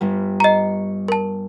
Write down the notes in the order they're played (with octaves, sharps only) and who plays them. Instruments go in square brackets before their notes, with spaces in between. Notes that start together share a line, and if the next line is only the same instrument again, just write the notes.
[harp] G1 G3
[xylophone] D#5 A#5 [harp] C#6 C7
[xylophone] A#4 A5